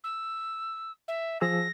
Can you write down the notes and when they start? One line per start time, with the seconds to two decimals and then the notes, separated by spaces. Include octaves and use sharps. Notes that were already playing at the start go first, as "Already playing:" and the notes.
0.04 E6
1.08 E5
1.41 F3 G#4 E6 A#6